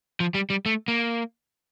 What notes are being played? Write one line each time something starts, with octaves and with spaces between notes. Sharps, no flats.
F3
G3
G3
A3
A#3